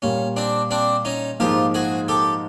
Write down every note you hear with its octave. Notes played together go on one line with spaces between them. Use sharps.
A#2 G3 A#3 C#4
C4 D4
C4 D4
C#4 D#4
G#2 F3 A#3 F4 G4
F#4 G#4
G4 A4